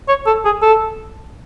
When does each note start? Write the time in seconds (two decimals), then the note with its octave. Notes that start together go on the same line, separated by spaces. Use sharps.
0.08 C#5
0.26 A4
0.45 G#4
0.62 A4